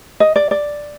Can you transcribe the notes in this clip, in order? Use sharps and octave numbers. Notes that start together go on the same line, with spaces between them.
D#5
D5
D5